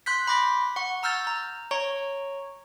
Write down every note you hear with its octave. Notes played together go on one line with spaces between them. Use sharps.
C6 F#6 G6 B6
B5 C6 D6 A#6 B6
F#5 C#6
A#5 E6 F6 G6 A6
A#5
C#5 A#5 C#6